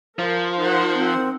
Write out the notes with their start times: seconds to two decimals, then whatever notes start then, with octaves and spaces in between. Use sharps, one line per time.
0.19 F3 A#4
0.57 D#4 A#4 C5 F#5
0.94 C4